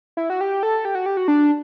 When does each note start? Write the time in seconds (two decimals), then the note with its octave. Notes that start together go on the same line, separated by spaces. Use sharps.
0.17 E4
0.30 F#4
0.41 G4
0.63 A4
0.85 G4
0.95 F#4
1.06 G4
1.17 F#4
1.28 D4